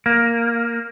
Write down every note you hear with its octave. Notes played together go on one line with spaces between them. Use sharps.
A#3